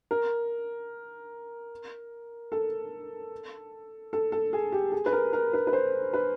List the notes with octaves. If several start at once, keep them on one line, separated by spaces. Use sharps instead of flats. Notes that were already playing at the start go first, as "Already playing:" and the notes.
A#4
A4
A4
A4
G#4
G4
G#4
B4
A#4
A#4
B4
B4
C5
B4